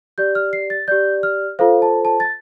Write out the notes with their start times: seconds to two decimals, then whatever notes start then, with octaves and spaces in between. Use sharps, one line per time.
0.18 G4 D5 G6
0.35 F6
0.53 C7
0.70 A6
0.88 G4 D5 G6
1.23 F6
1.59 F4 A4 C5 F5
1.82 A5
2.05 A5
2.20 A6